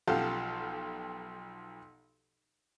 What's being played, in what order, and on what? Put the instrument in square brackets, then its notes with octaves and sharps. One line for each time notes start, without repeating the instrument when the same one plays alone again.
[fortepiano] B1 F3 G4 A4 F5 F#5